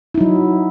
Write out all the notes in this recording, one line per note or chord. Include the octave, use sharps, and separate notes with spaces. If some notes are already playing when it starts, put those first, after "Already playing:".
F#3 D#4 E4